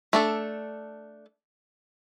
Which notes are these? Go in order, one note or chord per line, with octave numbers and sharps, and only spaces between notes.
A3 D4 A4